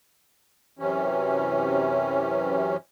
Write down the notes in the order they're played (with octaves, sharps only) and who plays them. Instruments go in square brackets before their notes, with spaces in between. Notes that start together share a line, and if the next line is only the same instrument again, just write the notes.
[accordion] F#2 C3 E3 C#4